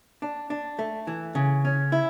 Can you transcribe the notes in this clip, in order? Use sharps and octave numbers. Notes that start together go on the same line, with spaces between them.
D4
D4
A3
E3
C#3
C#4
E4